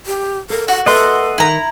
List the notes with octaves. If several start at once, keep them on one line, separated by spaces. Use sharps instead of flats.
G4
A4 A#4
F#4 F#5
A#3 A4 B4 D#5 E5 F#5 C6
D#3 D#4 E4 A#5